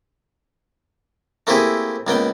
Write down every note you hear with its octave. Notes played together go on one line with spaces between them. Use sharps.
A3 A#3 C4 E4 G4 G#4
C#2 A#3 B3 G5